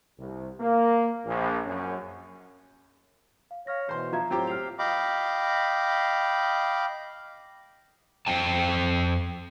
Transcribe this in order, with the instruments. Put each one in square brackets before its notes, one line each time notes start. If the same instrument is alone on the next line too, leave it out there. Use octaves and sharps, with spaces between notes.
[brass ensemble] C2
A#3
A#1
F#2
[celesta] F5
[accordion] C#5 [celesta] F5 F6 A#6
[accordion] B2 E3 [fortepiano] C5 C6
[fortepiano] F3 E5 [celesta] F5 A#5 G#6
[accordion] A2 F#3 [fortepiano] C4 F4 G4 [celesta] G5 A#5 D6
[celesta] F6 C7 F7
[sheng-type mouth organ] D#5 F5 G5 B5 D6
[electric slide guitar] F2 C4 G5 A5